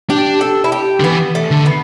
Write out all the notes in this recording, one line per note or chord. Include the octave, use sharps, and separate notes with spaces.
D4 G4
A4
E4
G4
D3
E3 B3
A3
D3
B3